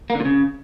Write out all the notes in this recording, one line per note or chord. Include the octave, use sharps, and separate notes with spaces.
A#3
D3
A#2
C#3